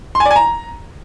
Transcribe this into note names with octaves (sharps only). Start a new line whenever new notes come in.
C6
G#5
D5
G#5
A#5